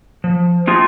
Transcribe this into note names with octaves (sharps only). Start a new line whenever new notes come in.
F3
A3 C4 F4 G#4